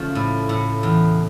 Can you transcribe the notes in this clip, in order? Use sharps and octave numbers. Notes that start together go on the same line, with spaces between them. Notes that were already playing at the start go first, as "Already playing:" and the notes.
Already playing: C#3 F3 A3
A2
A2
E2